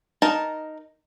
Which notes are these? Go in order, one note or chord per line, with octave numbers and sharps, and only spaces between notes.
D#4 A#4 A5